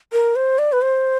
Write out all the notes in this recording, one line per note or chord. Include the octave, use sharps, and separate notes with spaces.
A#4
C5
D5
B4
C5